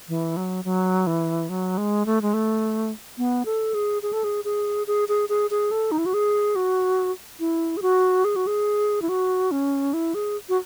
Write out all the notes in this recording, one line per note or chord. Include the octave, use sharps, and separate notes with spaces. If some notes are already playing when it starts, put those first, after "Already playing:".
E3
F#3
F#3
E3
F#3
G#3
A3
G#3
A3
B3
A4
G#4
G#4
A4
G#4
G#4
G#4
G#4
G#4
G#4
A4
D#4
E4
F#4
G#4
F#4
E4
G#4
F#4
G#4
F#4
G#4
E4
F#4
C#4
E4
G#4
F#4